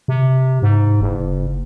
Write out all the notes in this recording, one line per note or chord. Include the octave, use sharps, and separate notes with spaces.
C3
G#2
F#1